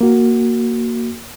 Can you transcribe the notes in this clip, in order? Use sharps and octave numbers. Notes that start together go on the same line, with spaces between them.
A#3 F#4